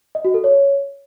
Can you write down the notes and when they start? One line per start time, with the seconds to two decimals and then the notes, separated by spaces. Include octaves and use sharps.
0.15 D#5
0.25 F#4
0.34 A4
0.44 C#5